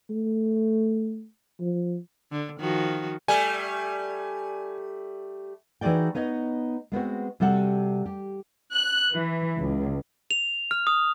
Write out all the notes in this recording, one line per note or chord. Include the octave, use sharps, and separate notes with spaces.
A3
F3
D3
D#3 F3 F#4
G3 A3 G#5
E3 D#4 F#4 G#4 D5 G5
B3 D#4 C#5 D#5
G#3 B3 C4 F#4
C3 G3 F#4 A4 F#5
G4
F#6
E3
C#2
F7
F6
D#6